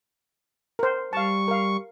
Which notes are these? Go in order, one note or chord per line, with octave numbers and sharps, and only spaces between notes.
A#4 C5
G3 F5 A5 C#6
A#4 F5